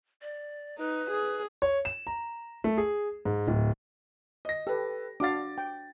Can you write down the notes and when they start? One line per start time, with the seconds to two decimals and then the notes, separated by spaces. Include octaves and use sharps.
0.22 D5
0.79 D#4 B4
1.11 G#4
1.62 C#5
1.85 E7
2.07 A#5
2.64 A3
2.78 G#4
3.25 G#2
3.47 D1
4.45 D#5 A#6
4.67 G4 A4 B4
5.20 D4 F#4 F5 D6 A6
5.58 G5